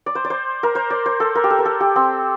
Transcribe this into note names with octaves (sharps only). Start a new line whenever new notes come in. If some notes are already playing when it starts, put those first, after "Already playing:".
D5
C5
D5
C5
A#4
C5
D5
C5
A4
A#4
G4
A4
A#4
A4
G4
C4